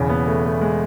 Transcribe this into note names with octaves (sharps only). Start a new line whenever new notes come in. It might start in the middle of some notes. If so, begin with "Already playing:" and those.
Already playing: E1 E2 C#3
B3
A3
A3
G#3